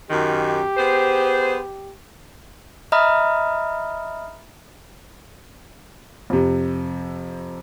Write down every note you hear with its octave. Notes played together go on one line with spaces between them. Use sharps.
F#2 D#3 G4
B3 G#4 C5
D#5 E5 A#5 B5 D#6 F6
F2 C3